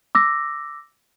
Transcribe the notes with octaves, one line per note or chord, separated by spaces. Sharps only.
D6 E6 A#6